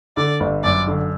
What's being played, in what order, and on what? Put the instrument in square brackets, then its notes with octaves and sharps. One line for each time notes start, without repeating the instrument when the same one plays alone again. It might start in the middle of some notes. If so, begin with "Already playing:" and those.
[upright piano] D3 [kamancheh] D5
[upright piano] G1
[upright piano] F#2 [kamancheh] D5
[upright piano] D3